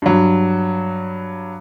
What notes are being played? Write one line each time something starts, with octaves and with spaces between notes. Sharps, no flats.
G2 F#3